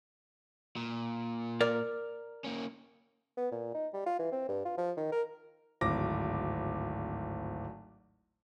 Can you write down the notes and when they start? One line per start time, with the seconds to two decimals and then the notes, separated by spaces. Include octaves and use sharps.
0.76 A#2
1.61 A#4 D5
2.44 A#3 C#4
3.37 B3
3.52 A#2
3.74 D#4
3.94 G3
4.06 F4
4.19 E3
4.32 C4
4.49 G2
4.65 F4
4.78 F3
4.97 D#3
5.12 A#4
5.81 D1 G#1 D6 A#6